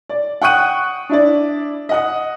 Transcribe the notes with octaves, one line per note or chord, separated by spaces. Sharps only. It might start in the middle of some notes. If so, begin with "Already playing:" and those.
D5
F#5 G5 C#6 D#6 F#6 D#7
D4 E4 D5
D#5 F#5 D#6